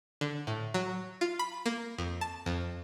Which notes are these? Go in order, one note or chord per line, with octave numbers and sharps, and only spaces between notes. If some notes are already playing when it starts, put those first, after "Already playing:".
D3
A2
F#3
F4
B5
A#3
F2
A5
F2